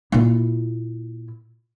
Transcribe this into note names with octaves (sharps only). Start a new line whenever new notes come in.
A#2 E4